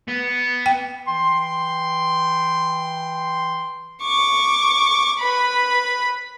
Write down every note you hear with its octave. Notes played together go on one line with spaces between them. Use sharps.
B3
G5
E3 G5 C6
C#6 D6
B4 B5